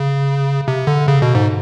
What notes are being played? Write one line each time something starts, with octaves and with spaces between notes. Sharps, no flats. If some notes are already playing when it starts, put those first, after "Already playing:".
Already playing: C#3
C3
D3
C#3
B2
G#2